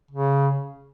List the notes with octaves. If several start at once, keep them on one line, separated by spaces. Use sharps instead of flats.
C#3